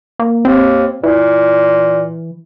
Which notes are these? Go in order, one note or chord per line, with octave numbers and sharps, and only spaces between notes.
A#3
D#2 C4
A#2 E3